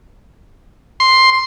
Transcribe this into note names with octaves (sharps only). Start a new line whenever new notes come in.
C6